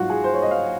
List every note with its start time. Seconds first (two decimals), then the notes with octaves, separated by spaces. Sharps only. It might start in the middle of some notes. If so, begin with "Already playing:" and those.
Already playing: G#2 F#3 F4 F#4
0.10 G#4
0.24 C5
0.34 C#5
0.42 D#5
0.51 F5